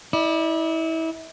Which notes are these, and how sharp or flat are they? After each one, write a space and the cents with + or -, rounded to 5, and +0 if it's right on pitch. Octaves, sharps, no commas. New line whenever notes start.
E4 -30 D5 +30